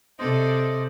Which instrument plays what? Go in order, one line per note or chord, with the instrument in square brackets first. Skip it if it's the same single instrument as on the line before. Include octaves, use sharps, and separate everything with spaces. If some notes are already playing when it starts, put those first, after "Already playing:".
[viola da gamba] C3 A4 D5 [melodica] C5 D#5